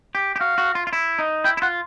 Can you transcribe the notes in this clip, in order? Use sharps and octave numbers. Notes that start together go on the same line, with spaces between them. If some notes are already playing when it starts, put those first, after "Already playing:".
G4
G4
F#4 F5
F#4
F4
F4
E4
D#4
E4 G5
E4
F4 F#5